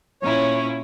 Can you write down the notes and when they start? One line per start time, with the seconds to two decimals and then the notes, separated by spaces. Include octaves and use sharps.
0.22 A#2 C#4 E4 C#5